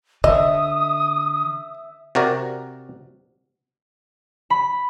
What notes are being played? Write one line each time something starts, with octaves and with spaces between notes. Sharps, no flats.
D3 D#5 E5 D#6
C3 F#4 A#4 D5
B5